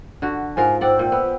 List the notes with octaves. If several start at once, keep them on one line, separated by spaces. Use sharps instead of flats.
D3 F#4
G#2 F4 A#4 G#5
G#2 C5 D5 F#5 G5 E6
A#2
B3